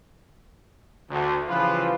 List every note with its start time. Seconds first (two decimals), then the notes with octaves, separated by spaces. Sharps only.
1.10 D2
1.48 C#3 E3 F3 G3 F4 B4